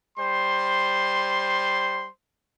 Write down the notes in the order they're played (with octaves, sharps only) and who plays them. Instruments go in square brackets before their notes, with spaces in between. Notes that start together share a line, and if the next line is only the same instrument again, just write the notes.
[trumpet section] G3 C5 C6